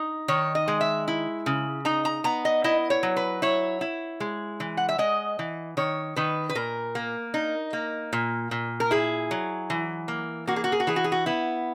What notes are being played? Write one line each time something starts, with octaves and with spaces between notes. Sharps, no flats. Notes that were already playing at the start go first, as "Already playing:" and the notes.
Already playing: D#4
D#3 C#5
D#5
G#3
E5
E4
C#3
D#4 A#5
A#5
B3 A#5
D#5
E4 D#5
C#5
F#3
B4
E4 C#5
E4
G#3
E3
F#5
E5
G#3 D#5
E3
D#3 C#5
D#3 B4
B4
A#2 A#4
A#3
D#4
A#3
A#2
A#2
A#4
E4 G#4
F#3
E3
A#3
A#3 F#4
G#4
F#4
G#4
F#4
E3 G#4
F#4
G#4
F#4
B3 E4